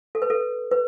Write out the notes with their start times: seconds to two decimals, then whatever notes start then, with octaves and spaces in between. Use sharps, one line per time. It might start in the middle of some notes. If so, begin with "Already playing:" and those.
0.15 A4
0.22 B4
0.30 A4
0.71 B4